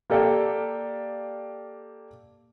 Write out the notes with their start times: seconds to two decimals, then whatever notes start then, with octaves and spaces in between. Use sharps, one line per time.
0.10 A#3 G4 A4 D5 F5 G5